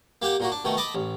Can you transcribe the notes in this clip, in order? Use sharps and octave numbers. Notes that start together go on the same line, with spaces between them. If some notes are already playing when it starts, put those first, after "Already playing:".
A#3 G4 F#5 G5
A#2 A#3 F#4
D4
B2 D#3 A3
D#5 A5 B5 D6
A1